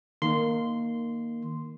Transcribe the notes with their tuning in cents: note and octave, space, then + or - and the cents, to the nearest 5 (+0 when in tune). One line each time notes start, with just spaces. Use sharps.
D#3 -10 A#3 +0 C6 -10